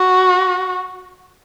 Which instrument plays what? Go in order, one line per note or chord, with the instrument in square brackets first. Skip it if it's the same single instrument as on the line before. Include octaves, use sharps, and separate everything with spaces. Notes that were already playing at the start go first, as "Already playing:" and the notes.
Already playing: [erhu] F#4